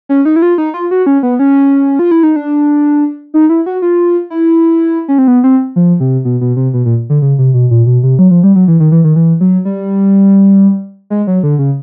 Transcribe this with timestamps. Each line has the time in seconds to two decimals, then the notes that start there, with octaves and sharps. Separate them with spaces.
0.09 C#4
0.25 D#4
0.36 E4
0.42 F4
0.58 D#4
0.74 F4
0.91 F#4
1.06 C#4
1.23 B3
1.39 C#4
1.99 F4
2.11 E4
2.23 D#4
2.36 D4
3.34 D#4
3.49 E4
3.66 F#4
3.82 F4
4.30 E4
5.08 C#4
5.18 C4
5.28 B3
5.44 C4
5.76 F3
6.00 C3
6.25 B2
6.41 B2
6.57 C3
6.74 B2
6.86 A#2
7.10 D3
7.22 C#3
7.39 C3
7.54 B2
7.71 A#2
7.86 B2
8.03 C3
8.19 F#3
8.31 F3
8.43 G3
8.56 F#3
8.68 E3
8.80 D#3
8.92 E3
9.04 D#3
9.16 E3
9.41 F#3
9.65 G3
11.10 G#3
11.27 F#3
11.43 D3
11.59 C#3